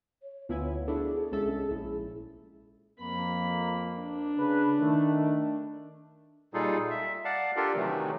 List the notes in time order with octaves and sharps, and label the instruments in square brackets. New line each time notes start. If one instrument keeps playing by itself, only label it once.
[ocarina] C#5
[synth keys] D2 E4 G#5 [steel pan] B3 F4 [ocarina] C#5
[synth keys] D4 E4 F#4 [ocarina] G#4 [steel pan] A4
[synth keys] C2 A4 E5 [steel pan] G#3 C#4
[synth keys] A#1 [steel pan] E4
[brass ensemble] F2 A#3 [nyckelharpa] B5
[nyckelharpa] D4
[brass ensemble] C#3 B4
D#3 A3
[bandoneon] A#2 G3 D#4 F4 G#4 A4
E5
D5 F5 F#5 A5
D4 F4 G4 A4 A#4
C3 D#3 E3 F#3 A3